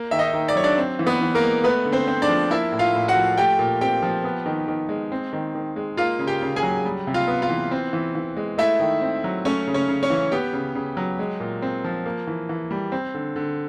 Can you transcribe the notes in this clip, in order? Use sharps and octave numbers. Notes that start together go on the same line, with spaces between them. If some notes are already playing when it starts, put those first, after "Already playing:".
Already playing: A#3
D#3 E5
D#4 D#5
D#3
D5
F#3 C#5
D4 D5
C4
E3
B3 B4
E3
A#3 A#4
G#3
A3 B3 B4
D3
C4 C5
C4
D4 D5
F3
A#3 E4 E5
A2
F4 F5
A2
F#4 F#5
F3
A3 G4 G5
A#2
C4 G4 G5
F3
B3
D#3
D#3
G#3
C4
D#3
D#3
G#3
A#3 F4 F5
C#3
G4 G5
C#3
G#4 G#5
F#3
G3
C3
F4 F5
B3
F4 F5
E3
C4
E3
E3
G#3
A3 E4 E5
D#3
C4
F#3
A3 C#4 C#5
C#3
C#4 C#5
C#3
C#4 C#5
E3
B3 G4 G5
C#3
C#3
F#3
G#3
A#2
C4
F3
A#3
E3
E3
G3
C4
D3
D3